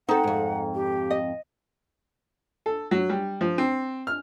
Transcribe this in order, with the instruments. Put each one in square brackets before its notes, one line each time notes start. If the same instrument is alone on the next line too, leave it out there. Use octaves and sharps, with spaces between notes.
[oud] C4 A4 [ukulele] D#4 [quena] F#5
[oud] F2 G#2
[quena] G4
[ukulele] D#5
[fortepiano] A4
F#3
G3
F3
C4
F6